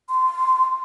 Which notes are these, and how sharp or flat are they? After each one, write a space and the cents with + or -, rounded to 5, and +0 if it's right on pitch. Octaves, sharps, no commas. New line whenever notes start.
C6 -15